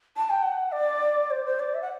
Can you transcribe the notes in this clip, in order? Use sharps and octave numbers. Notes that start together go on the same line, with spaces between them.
A5
G5
F#5
D5
C5
C5
D5
E5
F#5